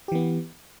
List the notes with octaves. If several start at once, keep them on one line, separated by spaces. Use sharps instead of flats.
E3 B3 G4